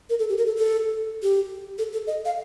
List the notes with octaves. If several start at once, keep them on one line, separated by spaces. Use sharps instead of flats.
A#4
A4
G4
A#4
A4
A4
G4
A4
A4
D#5
F5